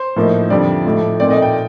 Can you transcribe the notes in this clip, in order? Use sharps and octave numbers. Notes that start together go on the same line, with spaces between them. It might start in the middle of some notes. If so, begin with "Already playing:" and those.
Already playing: C5
A2 F3 A#3 D#4
F2 D3 G3 D5
A2 F3 A3 D#4
A#2 A3 C4 D#4 D5
D#5
G5